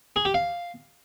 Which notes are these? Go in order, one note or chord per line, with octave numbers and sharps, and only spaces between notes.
G#4
G4
F5